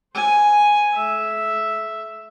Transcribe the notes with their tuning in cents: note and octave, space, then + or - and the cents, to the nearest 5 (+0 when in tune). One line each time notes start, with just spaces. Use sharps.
C5 +0 G#5 +0
A3 -40 E5 +0